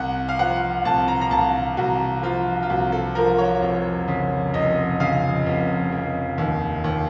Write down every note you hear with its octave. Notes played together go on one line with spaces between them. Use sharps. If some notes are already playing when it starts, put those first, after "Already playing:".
Already playing: C2 F#5
F5
F3 F#5
C2 A5
A#5
A#5
C2 A5
C2 F#4
F3 F4
F4
C2 F#4
A4
F3 A#4
C#5
F1
C#3
F1 D#5
C#3 F5
F1
F1
D#2
D#2